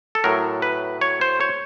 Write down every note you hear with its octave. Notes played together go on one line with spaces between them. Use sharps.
A4
A2 F#3 A#4
B4
C#5
C5
C#5